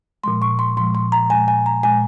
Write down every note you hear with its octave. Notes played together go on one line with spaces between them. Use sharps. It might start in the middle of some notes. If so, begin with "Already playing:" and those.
A#2 F3 G#3 C6
C#6
C6
A#2 F3 G#3 C6
C6
A#5
A#2 G#3 G#5
G#5
A#5
A#2 G#3 G#5